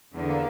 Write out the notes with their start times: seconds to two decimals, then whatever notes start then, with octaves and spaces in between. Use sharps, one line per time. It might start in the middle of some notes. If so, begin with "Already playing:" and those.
0.13 E2 D3
0.28 A#3